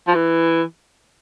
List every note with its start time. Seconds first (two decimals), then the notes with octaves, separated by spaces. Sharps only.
0.08 F3
0.15 E3